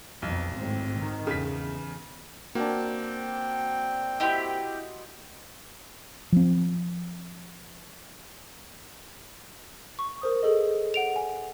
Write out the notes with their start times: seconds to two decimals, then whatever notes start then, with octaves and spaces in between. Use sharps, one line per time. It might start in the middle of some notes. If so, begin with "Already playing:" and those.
0.22 B1 F2 B2
0.55 G#1 A2 C4
0.97 D#3
1.27 E2 C#3 B6
2.55 A#3 C4 D4 F#4 G5
4.20 E4 G4 D#5 F#5 C6
6.32 F3 C4
9.99 C#6
10.22 A#4 C5 D#6
10.43 G#4 A4 D#5
10.94 F#5 D7 F7
11.16 G#5